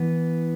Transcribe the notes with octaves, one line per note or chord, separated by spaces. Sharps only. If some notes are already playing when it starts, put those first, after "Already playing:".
Already playing: E3 B3